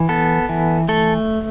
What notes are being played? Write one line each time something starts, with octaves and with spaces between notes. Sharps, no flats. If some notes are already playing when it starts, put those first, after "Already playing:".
Already playing: E3
B3 A4
E3
A3 A4